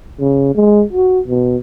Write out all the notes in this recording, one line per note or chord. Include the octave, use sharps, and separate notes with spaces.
C#3
G#3
F#4
B2